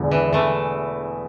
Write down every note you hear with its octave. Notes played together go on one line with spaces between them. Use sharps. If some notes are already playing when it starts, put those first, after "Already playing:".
Already playing: E1 E2 D3
E3
E3 A3